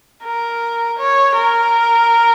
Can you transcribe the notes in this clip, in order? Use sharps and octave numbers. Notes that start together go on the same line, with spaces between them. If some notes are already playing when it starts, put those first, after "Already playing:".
A#4
C#5
A#4